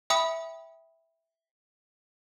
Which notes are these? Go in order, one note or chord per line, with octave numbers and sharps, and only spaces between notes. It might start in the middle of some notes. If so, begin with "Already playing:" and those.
E5 G5 B5 D#6